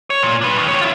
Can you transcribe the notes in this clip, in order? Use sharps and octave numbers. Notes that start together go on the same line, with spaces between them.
C#5
A#2
D4 B4
D#2
D#3 C#5
E4 F4